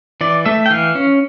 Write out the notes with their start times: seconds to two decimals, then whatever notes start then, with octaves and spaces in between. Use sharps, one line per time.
0.21 E3 D5
0.46 A3 E5
0.66 G5
0.70 E3 F5
0.95 C#4